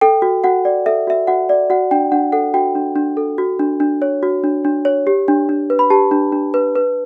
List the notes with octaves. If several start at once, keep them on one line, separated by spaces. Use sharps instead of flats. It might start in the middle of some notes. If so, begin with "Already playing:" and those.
A4 G5
F#4
F#4 F#5
D5
A4 E5
F#4 E5
F#4 F#5
D5
F#4 F#5
D4 G5
D4 F#5
A4 F#5
F#4 G5
D4
D4
A4
F#4
D4
D4
C#5
F#4
D4
D4
C#5
G4
D4
D4
B4
B5
G4 A5
D4
D4
B4
B4